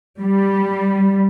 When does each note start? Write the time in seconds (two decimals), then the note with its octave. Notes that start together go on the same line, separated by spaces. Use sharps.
0.21 G3